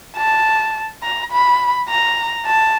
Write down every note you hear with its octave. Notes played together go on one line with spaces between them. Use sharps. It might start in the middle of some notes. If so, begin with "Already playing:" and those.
A5
A#5
B5
A#5
A5